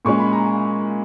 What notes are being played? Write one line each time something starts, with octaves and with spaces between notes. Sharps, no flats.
A#2 G#3 C#4 C#6
B5
A#5